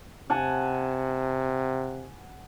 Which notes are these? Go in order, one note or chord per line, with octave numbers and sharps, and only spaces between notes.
C3 F#5 G#5 A5